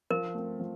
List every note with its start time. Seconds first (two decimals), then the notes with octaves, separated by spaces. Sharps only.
0.11 F3 A#4
0.35 A3 C4
0.60 F3